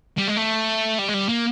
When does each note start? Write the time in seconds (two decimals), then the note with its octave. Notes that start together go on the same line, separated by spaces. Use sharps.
0.18 G3
0.27 G#3
0.36 A3
0.98 G3
1.08 G#3
1.14 G3
1.29 A#3